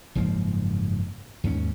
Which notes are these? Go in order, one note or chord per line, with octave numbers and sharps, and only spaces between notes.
F#1 G#2 F3 A#3
D#2 G#2 G3 C#4